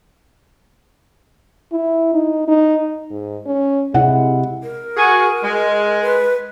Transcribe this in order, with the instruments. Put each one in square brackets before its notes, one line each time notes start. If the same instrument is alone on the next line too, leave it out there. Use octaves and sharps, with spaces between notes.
[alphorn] E4
D#4
D#4
G#2
C#4
[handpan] C3 E4 [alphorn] G#3 [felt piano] F#5
[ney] A#4
[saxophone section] F#4 G#4
G#3
[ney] B4